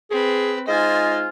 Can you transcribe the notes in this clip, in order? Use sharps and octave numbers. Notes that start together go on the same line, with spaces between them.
C4 G#4 B4
G#3 D#4 F4 C5 D#5 G#5